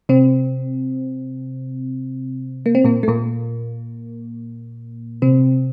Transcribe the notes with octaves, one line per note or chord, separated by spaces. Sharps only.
C3 C4
A#3
C4
A#2 A#3
A3
A#2 A#3
C3 C4